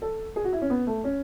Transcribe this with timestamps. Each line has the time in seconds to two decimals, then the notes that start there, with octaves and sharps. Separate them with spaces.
0.02 A4
0.36 G#4
0.44 F#4
0.53 E4
0.62 C#4
0.70 B3
0.87 A3
1.04 C#4